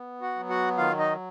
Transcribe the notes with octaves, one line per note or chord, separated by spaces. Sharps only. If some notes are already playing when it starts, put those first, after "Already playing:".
Already playing: B3
F#4 F#5
F#3
F#4 F#5
D#3 F4 F5
D#4 D#5